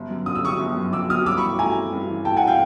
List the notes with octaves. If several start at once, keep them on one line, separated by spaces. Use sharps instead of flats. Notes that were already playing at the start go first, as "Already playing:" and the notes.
Already playing: G1
F#2
D3 D#6
E6
G1 C#6 D#6
G1
F#2
D3 D6 E6
G1 D#6 F6
G2 D6 E6
B5 C#6
E3
A3 G#5 A#5
C4
G2
E3
A3 G5 A5
F#5 G#5
C4
F5 G5